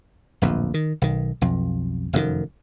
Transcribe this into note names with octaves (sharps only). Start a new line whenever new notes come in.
D1 A#1 F2
D#3
B1 D#3
B1 F2
F1 F#2 A#2 D#3